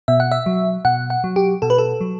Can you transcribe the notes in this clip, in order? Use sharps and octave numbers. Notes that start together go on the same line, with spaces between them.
B2 E5
F#5
E5
F#3
B2 F#5
F#5
F#3
G4
B2 A4
B4
A4
F#3